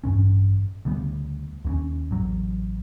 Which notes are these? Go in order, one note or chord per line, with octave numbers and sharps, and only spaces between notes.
A1 G2 A#2 C#4
D2 C#3 G3 B3
D#2 A#3 C#4
A1 F#3